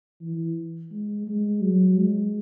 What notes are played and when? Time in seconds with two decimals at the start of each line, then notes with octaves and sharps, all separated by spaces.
0.22 E3
0.92 G#3
1.27 G#3
1.62 F#3
1.97 G#3